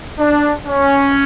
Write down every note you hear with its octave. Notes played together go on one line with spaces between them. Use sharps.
D4
C#4